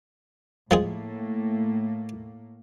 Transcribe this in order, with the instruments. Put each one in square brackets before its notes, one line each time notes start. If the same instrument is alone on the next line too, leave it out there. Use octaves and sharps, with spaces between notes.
[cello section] A2 A#3 [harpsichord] F3 G#3 G#4